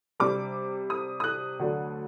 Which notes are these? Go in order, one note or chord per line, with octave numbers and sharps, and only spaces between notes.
C3 G3 D4 D6
D#6
D#6
F#6
D2 D3 F#3 A3 D4